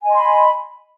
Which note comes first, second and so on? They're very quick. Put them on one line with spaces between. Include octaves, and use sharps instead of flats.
G#5 D#5 C6 B5